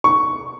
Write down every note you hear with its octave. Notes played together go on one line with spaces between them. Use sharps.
C#6